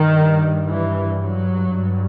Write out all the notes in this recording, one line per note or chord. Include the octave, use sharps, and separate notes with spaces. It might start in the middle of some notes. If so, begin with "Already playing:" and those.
Already playing: G2 D#3
E3
F#3
G2